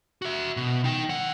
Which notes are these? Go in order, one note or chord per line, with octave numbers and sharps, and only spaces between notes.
F#4 E5
B2
D#4 G5
D#3 F#5